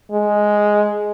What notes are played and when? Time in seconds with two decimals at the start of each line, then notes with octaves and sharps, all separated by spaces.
0.11 G#3